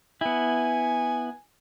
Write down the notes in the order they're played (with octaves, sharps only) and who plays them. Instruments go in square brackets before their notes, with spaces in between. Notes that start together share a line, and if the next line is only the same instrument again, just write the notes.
[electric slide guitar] B3 E4 [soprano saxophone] G#5